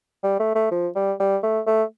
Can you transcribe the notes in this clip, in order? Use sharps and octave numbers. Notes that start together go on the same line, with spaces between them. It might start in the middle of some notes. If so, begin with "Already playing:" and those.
G3
A3
A3
F3
G3
G3
A3
A3